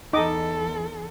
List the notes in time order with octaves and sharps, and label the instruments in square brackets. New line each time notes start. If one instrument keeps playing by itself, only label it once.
[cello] E2 A4 [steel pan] D#4 D#5 D6